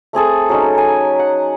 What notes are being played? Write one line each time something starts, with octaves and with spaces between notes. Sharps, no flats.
A3 C4 G#4 A4
F#3 C#4 D#4
G#5
F#5